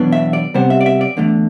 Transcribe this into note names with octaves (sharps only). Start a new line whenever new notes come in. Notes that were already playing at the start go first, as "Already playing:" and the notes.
Already playing: E2 B2 F#3 B3 D4
E5
D5
C3 G3 B3 C5
E5
D5
E5
D5
E2 D3 A3